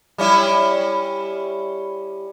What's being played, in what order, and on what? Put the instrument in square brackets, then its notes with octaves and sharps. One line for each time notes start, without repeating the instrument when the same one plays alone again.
[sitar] G3 C#4 E4